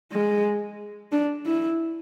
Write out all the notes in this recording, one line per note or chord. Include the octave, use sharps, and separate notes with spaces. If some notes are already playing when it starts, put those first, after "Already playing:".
G#3
D4
E4